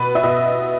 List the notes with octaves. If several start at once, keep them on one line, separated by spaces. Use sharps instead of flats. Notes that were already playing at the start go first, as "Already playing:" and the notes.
Already playing: B2 B4
E5
B2 D#5